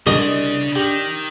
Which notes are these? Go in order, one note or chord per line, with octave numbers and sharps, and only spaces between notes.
C2 C#3 D4 D5 D#5
D#3 G4